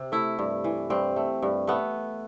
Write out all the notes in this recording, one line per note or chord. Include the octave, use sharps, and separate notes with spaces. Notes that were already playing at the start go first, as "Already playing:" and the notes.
Already playing: C3
A3 E4
G2
E3
G2 C4
A3
G2
A3 B3